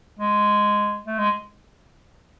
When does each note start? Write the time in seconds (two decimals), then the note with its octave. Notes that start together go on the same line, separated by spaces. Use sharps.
0.19 G#3
1.07 A3
1.18 G#3